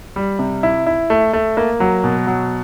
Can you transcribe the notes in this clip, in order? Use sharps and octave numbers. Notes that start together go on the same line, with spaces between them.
G3
C3
E4
E4
A3
A3
A#3
F#3
B2
F#3